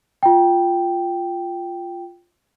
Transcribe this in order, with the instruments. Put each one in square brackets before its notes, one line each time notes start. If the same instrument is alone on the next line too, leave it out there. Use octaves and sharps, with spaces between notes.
[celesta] F4 G5